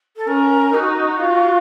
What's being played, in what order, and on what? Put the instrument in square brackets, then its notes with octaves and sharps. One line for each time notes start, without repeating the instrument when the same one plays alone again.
[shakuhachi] A4
[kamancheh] C#4 [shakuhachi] A#4
[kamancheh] D#4 [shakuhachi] F#4
[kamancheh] F4